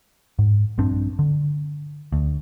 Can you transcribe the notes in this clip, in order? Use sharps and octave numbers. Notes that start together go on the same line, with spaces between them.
G#2
A#1 G2 C4 D4
D3
D2